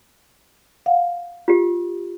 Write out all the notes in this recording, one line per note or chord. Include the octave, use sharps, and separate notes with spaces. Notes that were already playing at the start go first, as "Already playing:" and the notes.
F5 F#5
F4 G4